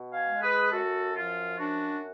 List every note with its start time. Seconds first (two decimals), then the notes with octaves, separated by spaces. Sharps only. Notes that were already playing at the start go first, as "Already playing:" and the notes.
Already playing: B2
0.12 F5 G#5
0.27 G#3
0.42 G#4 B4
0.71 F#2 F#4 A4
1.16 F3 F4
1.59 F#2 D4 F#4